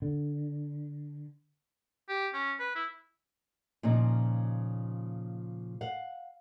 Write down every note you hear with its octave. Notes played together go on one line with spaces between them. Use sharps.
D3
G4
C#4
B4
E4
A#2 C#3 F3 D#4
F5 F#5